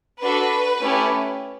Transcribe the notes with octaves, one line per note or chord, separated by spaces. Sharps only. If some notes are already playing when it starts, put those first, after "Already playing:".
D4 F#4 A4 B4
A3 C#4 E4 G4